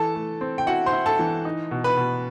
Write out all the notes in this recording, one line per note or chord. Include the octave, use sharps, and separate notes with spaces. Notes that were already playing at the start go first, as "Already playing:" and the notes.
Already playing: E3 A4 A5
A3
C4
G5
E4 F#4 F#5
C5 C6
E4
A4 A5
E3
D#4
B2
B4 B5
B2